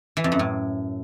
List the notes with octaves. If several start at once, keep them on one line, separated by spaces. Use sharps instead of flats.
E3
F2
F#2
A2